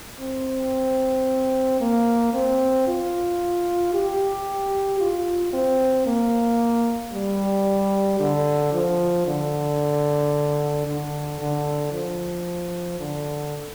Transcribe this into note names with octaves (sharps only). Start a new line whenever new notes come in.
C4
A#3
C4
F4
G4
F4
C4
A#3
G3
D3
F3
D3
D3
D3
F3
D3